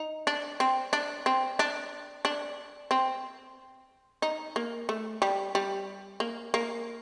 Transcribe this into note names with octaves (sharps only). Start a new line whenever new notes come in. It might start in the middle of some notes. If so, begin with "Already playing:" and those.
Already playing: D#4
D4
C4
D4
C4
D4
D4
C4
D#4
A#3
A3
G3
G3
A#3
A#3